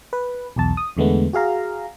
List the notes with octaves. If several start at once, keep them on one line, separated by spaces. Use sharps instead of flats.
B4
B1 E2 A5
D#6
E2 D3 G#3 A3 B3
F#4 G#4 F5 A#5